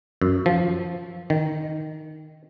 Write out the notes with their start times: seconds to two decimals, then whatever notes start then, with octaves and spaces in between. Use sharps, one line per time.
0.22 F#2
0.46 F3
1.30 D#3